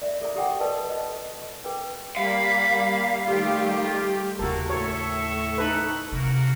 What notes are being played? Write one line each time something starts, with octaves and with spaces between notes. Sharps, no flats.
D5 E5
G#4 A4 D5 E5 A#5
G4 A4 F#5 G5 D6
A4 B4 D5 D#5 A5
D#5
G#4 B4 G5
G3 A#3 F5 B5
D#3 G3 A3 F4 G4
D#2 C#3 A#3 F#4 A4
A2 A4 C#5 E5 C#6
D#4 A4 B4
C3 A#3 F#4 A#4